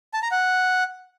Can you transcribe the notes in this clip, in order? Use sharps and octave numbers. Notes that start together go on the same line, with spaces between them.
A5
A#5
F#5